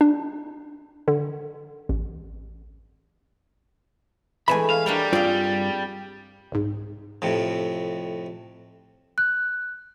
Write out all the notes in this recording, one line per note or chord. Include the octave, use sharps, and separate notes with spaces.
D4
D3
A1
E3 G#3 A3 G#5 A5 B5
F5
G3 D4 A#4 C#5
G2 C4 F4 G#4 D5
C2 G#2
F2 A2 C3
F#6